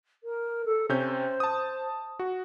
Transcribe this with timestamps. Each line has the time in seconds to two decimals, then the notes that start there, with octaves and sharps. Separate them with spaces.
0.23 A#4
0.65 A4
0.89 C3 C#4 C5 G6
1.40 A5 D#6
2.19 F#4